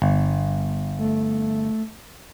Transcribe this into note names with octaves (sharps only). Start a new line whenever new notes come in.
G1
A3